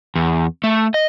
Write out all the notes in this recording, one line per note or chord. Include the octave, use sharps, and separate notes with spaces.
E2
A3
D#5